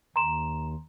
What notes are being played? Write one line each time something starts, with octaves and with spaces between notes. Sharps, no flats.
D#2 A#5 C6 E7